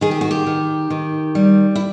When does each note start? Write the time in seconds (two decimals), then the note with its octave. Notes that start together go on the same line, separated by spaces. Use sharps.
0.01 D#3 G#4
0.11 G4
0.21 F#4
0.31 G4
0.47 D#3
0.90 D#3
1.35 G3
1.75 E4